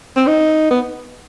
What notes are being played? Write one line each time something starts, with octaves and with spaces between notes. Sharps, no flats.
C4
D#4
B3